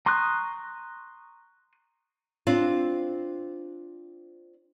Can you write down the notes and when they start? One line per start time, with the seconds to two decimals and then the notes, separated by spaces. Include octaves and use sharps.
0.06 A#5 C6 C#6 D#6 F#6
2.47 C4 D4 F4